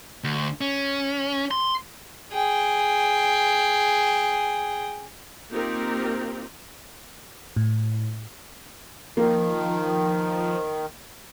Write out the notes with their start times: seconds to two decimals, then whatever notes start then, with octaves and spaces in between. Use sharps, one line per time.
0.24 D2
0.61 C#4
1.51 C6
2.33 G#4 G5
5.51 A#3 C4 D#4 F4 G4 A#4
7.56 A2
9.17 D#3 F3 A#3